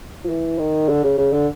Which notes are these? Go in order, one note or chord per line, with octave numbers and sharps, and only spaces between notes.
F3
E3
D#3
D3
C#3
C#3
D3